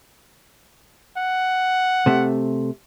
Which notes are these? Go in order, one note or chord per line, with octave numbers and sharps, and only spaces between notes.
F#5
C3 A3